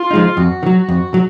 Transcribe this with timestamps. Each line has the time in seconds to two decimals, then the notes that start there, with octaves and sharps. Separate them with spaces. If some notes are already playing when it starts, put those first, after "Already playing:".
Already playing: F4
0.11 F3 G#3 D#4
0.37 F2 F#4
0.63 D#3
0.66 F#3
0.89 F2
1.14 F#3